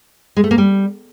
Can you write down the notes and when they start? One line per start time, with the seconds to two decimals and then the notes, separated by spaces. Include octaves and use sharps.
0.37 G#3
0.44 A3
0.51 A#3
0.58 G3